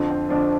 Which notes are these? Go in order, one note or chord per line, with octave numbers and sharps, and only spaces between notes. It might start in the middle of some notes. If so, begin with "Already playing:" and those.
Already playing: F2 D3 F3
C4
F2 D3 F3 D4